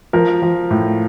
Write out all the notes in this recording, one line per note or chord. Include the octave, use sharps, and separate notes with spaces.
F3 A#4
F3
A2